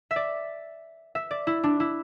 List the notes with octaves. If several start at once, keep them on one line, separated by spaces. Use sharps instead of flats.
E5
D5
E5
D5
E4
D4
E4